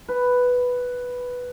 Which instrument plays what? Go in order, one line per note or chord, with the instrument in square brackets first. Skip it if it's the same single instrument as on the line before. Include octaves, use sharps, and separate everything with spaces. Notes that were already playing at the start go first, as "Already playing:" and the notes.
[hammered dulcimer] B4